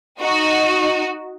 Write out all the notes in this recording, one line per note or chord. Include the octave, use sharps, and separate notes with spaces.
D#4 F#4